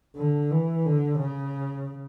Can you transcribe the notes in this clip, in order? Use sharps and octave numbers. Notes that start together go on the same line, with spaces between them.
D3
E3
D3
C#3